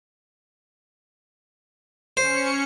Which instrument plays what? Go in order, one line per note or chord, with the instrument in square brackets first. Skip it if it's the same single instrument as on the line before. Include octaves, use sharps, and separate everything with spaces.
[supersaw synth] C#4 C#7 [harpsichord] C5